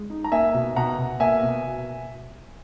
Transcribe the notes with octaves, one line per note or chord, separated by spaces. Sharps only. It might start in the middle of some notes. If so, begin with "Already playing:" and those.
Already playing: G#3
D#4
A#5
A#3 E5 G#5
B2
B2 F#5 A#5
B2
A#3 E5 G#5
B2